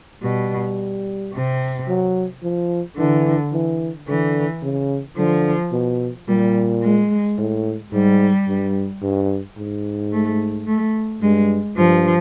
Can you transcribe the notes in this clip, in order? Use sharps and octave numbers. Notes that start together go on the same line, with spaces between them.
B2 G3
C3
F#3
F3
D3 E3
E3
D3 E3
C#3
D3 F3
B2
A#2 G3
G#3
A2
G#2 G3
G2
G2
G#2
A3
A3
G2 G#3
G2 F3